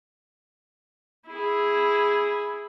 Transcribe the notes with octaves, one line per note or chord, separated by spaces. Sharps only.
E4 G#4